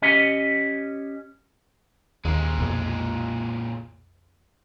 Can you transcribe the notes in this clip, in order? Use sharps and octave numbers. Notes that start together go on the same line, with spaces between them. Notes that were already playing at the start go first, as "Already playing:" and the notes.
C#4 G4 D#5
D#2 A#2 G#3
B1 F2